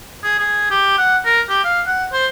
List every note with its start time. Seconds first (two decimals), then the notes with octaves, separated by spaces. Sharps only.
0.23 G#4
0.39 G#4
0.70 G4
0.98 F#5
1.25 A#4
1.49 G4
1.64 F5
1.87 F#5
2.13 C5